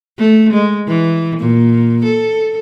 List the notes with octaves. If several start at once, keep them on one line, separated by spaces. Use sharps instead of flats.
A3
G#3
E3
A#2
A4